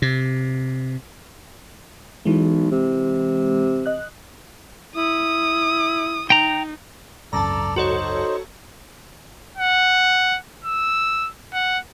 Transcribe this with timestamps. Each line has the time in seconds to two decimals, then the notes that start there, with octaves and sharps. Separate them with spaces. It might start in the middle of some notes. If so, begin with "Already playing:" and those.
0.02 C3
2.25 B1 E3 G#3
2.71 C3
3.86 D#5 F#6
4.95 E4 D#6
6.30 D#4 G5 A#5
7.33 G#1 C#2 F#2 A4 D5 A5 A#5
7.76 D#4 F#4 A4 C5 C#5
9.58 F#5
10.64 E6
11.54 F#5